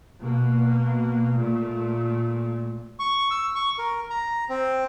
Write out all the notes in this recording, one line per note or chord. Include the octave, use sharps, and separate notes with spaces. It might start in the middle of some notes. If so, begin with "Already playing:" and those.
B2 A#3
A#2 A3
C#6
E6
C#6
A#4
A#5
C4